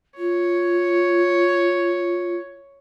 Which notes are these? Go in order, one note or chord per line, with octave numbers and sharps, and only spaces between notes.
F4 C#5